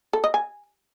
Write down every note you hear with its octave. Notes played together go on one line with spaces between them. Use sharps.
A4
D#5
G#5